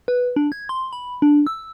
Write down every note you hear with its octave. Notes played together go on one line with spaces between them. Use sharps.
B4
D4
G#6
C6
B5
D4
E6